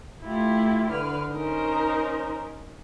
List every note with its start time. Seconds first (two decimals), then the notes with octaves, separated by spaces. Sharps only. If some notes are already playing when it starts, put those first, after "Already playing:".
0.25 A3 E4 F4 G4
0.89 D3 B4 F6
1.33 C#4 D#4 A#4 C5